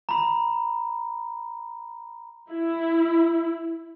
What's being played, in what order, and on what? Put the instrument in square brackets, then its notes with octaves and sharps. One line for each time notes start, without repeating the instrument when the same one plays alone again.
[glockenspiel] A#5 B5
[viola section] E4